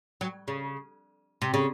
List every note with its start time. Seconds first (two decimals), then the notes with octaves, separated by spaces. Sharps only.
0.21 F#3
0.48 C#3
1.42 C3
1.54 C#3